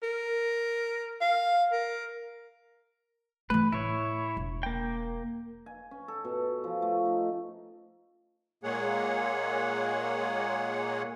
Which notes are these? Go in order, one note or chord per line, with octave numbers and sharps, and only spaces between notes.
A#4
F5
A#4
E3 A3 B4
A2 E4 C#5
E1
A#3 G5
G#5
C#4
A4
B2
F3
A3
D#4
A#2 G#3 A#3 G#4 C#5 F#5